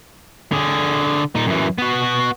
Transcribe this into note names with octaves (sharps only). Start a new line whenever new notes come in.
D3 G#4
A#2 D#4
F#2 E3
B3 F#4